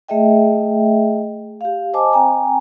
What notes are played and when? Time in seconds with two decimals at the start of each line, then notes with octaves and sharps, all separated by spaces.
0.09 A3 G#4 D#5 E5 G5
1.61 G4 F5
1.94 C5 D#5 G#5 A5 D6
2.12 C4 G5 G#5 A#5